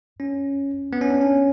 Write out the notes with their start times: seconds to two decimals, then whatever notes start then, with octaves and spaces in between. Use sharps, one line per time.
0.20 C#4
0.93 B3
1.01 C#4
1.11 D4
1.21 C#4